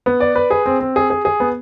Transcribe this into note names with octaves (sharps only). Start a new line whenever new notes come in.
B3
D5
B4
G#4
C4
C4
G#4
G#4
G#4
B3